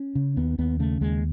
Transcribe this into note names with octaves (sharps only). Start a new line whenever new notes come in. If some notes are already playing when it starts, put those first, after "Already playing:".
Already playing: C#4
C#3
D#2 B3
D#2 B3
C#3 A3
D#2 G#3